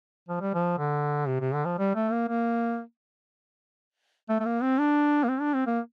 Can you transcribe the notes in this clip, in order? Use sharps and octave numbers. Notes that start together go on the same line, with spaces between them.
F3
G3
F3
D3
C3
C3
D3
F3
G3
A3
A#3
A#3
A3
A3
A#3
C4
D4
A#3
C4
D4
C4
A#3